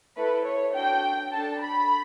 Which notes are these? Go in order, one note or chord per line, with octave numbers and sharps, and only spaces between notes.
A3 E4 A4 B4
C#5
D4 F#4 A4 G5
D4 A4 A5
B5